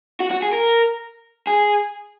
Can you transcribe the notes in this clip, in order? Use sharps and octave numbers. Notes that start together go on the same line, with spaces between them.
F#4
F#4
G#4
A#4
G#4